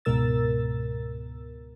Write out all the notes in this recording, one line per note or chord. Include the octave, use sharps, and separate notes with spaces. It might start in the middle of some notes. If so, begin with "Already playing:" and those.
C#2 G#2 B2 A#4 E6 A6